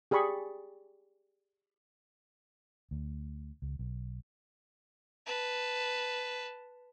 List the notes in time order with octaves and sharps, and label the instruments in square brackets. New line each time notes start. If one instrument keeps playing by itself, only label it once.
[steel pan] G4 G#4 D5 B5 C#6
[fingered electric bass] D2
C#2
B1
[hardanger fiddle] B4 A5